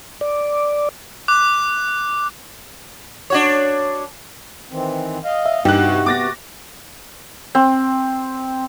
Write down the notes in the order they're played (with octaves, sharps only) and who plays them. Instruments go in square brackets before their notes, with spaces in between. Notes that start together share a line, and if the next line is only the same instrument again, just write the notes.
[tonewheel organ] D5
[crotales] D6 F#6
[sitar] D4 F#4 C#5
[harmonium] D#3 E3 C4
D#5 F5
[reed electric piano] E5
[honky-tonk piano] G2 F#6 [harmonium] E3 A#3 [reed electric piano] D#4 [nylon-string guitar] G4
[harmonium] C3 F#4 F#5
[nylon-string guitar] B3 [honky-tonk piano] D6 A6 A#6
[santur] C4